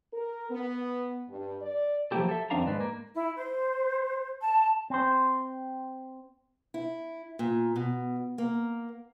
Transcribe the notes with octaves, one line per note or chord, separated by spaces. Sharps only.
A#4
B3
G2
D5
F3 F#3 A#3 E4 G4 A4
A4 E5
F2 D#3 C4 D4 F5 A#5
G#2 G#3 B4 D5
A#3
E4
C5
A5
C4 C5
E4
A#2
B2
A#3